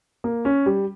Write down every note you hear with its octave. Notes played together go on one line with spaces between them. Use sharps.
A#3
C#4
G3